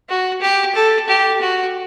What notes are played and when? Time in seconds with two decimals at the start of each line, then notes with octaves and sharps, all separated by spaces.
0.09 F#4
0.41 G4
0.75 A4
1.08 G4
1.41 F#4